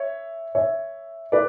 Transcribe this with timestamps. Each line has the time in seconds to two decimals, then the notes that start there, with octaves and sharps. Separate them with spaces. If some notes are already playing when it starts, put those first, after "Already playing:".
Already playing: C#5 E5
0.55 C#5 E5
1.32 B4 D5